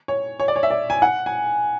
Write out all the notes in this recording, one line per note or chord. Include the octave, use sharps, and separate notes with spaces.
C#5
C#5
D5
C#5
E5
D5
G#5
F#5
G#5